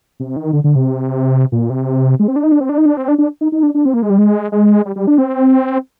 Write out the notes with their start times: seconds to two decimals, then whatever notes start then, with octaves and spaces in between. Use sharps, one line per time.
0.20 C3
0.36 D#3
0.53 D3
0.64 D3
0.75 C3
1.52 A#2
1.70 C3
2.19 G#3
2.28 C4
2.36 D4
2.43 D#4
2.52 D4
2.60 C4
2.69 D4
2.78 D#4
2.86 D4
2.97 C4
3.08 D4
3.18 D4
3.41 D#4
3.52 D#4
3.63 D4
3.74 D4
3.85 C4
3.94 A#3
4.02 G#3
4.10 G3
4.18 G#3
4.52 G#3
4.85 G3
4.96 G3
5.07 D4
5.18 C4